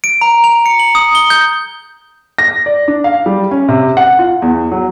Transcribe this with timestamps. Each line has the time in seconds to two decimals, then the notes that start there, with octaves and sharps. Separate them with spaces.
0.04 D7
0.21 A#5
0.44 F7
0.66 C#7
0.79 F#7
0.95 D#6
1.15 G7
1.30 G6
2.38 A#6
2.66 D5
2.88 D4
3.04 F5
3.26 G3
3.51 C#4
3.68 C3
3.97 F#5
4.19 F4
4.42 E2
4.72 F#3